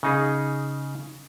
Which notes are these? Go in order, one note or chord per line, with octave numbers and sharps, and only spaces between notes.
C#3 D#4 G#4